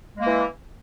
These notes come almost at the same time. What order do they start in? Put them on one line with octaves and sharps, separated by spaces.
G#3 A#3 E3